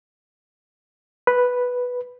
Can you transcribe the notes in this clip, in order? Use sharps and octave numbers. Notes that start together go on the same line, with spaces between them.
B4